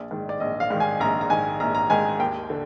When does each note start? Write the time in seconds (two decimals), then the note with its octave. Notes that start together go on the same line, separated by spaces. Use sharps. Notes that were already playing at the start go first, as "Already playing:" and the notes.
Already playing: A#1 D5
0.11 G#2 D#3
0.29 D5
0.40 A#1 D#5
0.60 F5
0.70 G#2 D#3
0.80 G#5
1.00 A#1 A#5
1.21 A#5
1.30 G#2 D#3 G#5
1.60 A#1 A#5
1.75 A#5
1.90 G#2 D#3 G#5
2.20 D#2 G5
2.50 D3